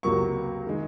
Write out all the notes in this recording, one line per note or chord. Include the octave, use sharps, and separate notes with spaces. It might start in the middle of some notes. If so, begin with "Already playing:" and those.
C#2 C3 F#3 A#3 C#6
D#3 G#3